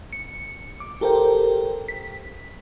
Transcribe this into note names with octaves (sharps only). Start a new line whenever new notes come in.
C#7
D6
G4 A4 A#4 C5 G5
B6